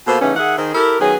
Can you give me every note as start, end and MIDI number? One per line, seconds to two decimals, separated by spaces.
0.07 0.20 47
0.07 0.20 58
0.07 0.20 65
0.07 0.20 69
0.07 0.20 72
0.21 0.36 49
0.21 0.36 52
0.21 0.36 57
0.21 0.36 59
0.21 0.36 61
0.21 0.36 63
0.36 0.57 51
0.36 0.57 68
0.36 0.57 76
0.36 0.57 78
0.58 0.71 51
0.58 0.71 68
0.58 0.71 72
0.75 0.98 64
0.75 0.98 67
0.75 0.98 69
0.75 0.98 70
1.00 1.16 51
1.00 1.16 54
1.00 1.16 59
1.00 1.16 61
1.00 1.16 68